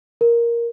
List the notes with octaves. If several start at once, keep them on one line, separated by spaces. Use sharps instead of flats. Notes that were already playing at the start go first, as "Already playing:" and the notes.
A#4